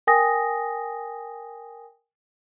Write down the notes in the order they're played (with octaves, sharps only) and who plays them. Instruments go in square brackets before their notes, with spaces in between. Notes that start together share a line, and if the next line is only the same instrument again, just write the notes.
[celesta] A#4 G5 G#5 D#6 A#6